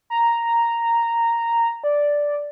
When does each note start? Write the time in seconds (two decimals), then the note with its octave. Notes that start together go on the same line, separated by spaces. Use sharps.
0.10 A#5
1.84 D5